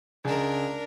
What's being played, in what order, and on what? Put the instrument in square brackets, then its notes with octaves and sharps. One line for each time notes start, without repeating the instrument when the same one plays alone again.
[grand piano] C#2 G#4 [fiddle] D4 A#4